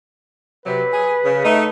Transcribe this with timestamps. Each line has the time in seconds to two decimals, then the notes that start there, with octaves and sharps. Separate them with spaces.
0.66 C3 F#3 B4
0.92 G#4
1.24 C#3
1.45 A3 D#4